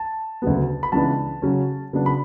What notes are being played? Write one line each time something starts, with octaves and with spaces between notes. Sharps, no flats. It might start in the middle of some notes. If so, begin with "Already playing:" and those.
Already playing: A5
D2 C#3 F#3 B3
B5
C#2 C#3 E3 B3 D4 A5
C#3 F#3 C#4
C#3 F#3 B3 D4
B5